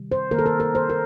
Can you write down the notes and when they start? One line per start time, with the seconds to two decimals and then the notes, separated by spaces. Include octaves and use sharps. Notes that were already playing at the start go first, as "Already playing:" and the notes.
Already playing: C3 D#3 G3
0.12 C5
0.31 D#3 A#3 A#4
0.39 A4
0.46 A#4
0.60 A#4
0.75 C5
0.90 A#4